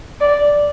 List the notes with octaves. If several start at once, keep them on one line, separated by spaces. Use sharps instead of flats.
D5